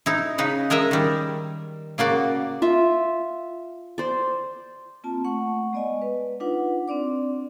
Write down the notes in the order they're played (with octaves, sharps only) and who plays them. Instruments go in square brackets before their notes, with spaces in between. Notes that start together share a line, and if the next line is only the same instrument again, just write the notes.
[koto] D#4 E4
C#3 D#4 B4
G#3 A#4 D#5 E5
D#3 G3
C#3 A#3 F#4 D5
[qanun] F4 E5
C5 D5
[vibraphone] A#3 C4 F4 A5
A3 F#5 C#6
G#3 B3 D5 D#5 G#5
B4
D4 D#4 F4 B4 F#5 D6
C4 D4 D5 D6